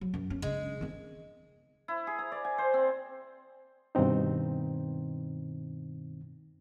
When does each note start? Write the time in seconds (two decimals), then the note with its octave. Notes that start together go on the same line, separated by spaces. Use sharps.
0.01 F#3
0.14 F#2
0.30 C#4
0.42 C#3 G#3 D4
0.81 D#3 C4
1.88 E4
2.07 G#4
2.19 A#5
2.32 D5
2.45 G#5
2.58 C5
2.74 C4
3.95 G2 B2 D#3 C4 D#4